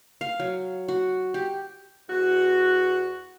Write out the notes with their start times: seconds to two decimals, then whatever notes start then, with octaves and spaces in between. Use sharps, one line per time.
0.21 F5
0.40 F#3
0.88 F#4
1.34 G4
2.10 E2 F#4